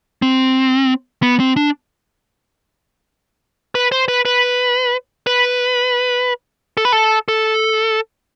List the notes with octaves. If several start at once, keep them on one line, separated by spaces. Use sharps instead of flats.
C4
B3
C4
D4
B4
C5
B4
B4
B4
A4
B4
A4
A4